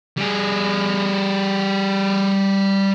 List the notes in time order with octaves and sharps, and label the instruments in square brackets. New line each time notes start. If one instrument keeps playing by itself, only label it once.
[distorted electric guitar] G3 G#4